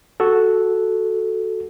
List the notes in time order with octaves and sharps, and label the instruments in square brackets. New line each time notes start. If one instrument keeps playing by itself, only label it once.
[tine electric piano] F#4 A4